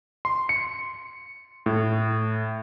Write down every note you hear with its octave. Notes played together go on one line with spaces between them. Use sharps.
C6
C#7
A2